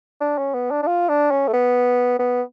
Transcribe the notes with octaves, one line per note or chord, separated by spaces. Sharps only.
D4
C#4
B3
D4
D4
F4
D4
C#4
A3
B3
B3